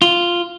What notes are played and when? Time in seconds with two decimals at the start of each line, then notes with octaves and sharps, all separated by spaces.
0.02 F4